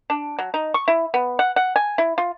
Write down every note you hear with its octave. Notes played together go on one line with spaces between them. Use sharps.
D4
F#3
D#4
C#6
E4
B3
F#5
F#5
G#5
E4
F4